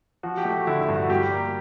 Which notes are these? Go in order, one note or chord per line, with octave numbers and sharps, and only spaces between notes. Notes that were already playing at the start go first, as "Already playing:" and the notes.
F3 F#4
G4
A3
F#4
D3 E4
E4
G2
F#4
G3 G4
A#3